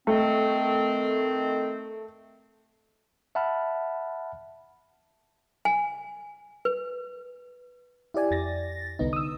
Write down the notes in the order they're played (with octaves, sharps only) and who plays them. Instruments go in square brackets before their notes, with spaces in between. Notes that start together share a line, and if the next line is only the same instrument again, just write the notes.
[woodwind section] D#3 C4 [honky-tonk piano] A3
[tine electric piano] E5 F#5 A5 B5 F6
[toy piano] G#5
B4
[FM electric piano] E4 G4 D5 G#5
F2 A6 A#6
C2 D3 B3 D#4
D#6 E6